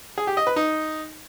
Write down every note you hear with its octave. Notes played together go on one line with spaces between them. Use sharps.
G#4
G4
D#5
B4
D#4